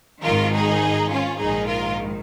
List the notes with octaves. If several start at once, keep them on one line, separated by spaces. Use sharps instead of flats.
G#1 G#2 D#3 F4 A#4
D#4 G#4
C#4 F4
A#1 G#2 D#3 D#4 G#4
F4 A#4